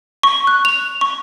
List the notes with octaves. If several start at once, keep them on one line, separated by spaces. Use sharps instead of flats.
C#6
F#6
F7
C#6